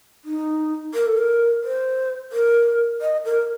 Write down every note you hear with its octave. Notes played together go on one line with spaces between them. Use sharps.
D#4
A#4
A4
A#4
C5
A#4
D#5
A#4